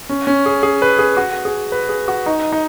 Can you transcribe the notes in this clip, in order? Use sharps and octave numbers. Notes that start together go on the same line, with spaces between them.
C#4
C#4
G#4
G#4
B4
G#4
F#4
G#4
B4
G#4
F#4
D#4
D#4